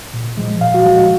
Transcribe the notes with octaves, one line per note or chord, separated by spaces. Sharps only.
A#2
F3 G#3
A#2 F5
F#4
F3 G#3 F#4
F#4